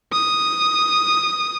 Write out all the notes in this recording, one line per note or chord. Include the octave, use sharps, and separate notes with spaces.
D#6